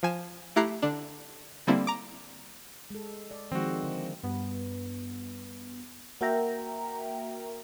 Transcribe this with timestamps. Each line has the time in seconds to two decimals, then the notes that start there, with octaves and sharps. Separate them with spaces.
0.03 F3 G#5 E7
0.56 A3 E4 G4 A#5 F#6 C7
0.82 D3 D4
1.67 D3 G3 A#3 C4 E4
1.87 A#5 D6
2.90 G#3 A4
3.31 D5
3.52 D#3 F3 G#3 C4 F#4
3.84 D3
4.23 G2 B3
6.21 A#3 F#4 A#4 E5 G5 A#5